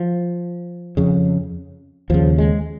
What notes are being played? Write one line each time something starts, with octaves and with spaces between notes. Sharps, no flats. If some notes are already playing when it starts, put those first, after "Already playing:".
Already playing: F3
F2 C#3
D#2 C#3 F3
G#3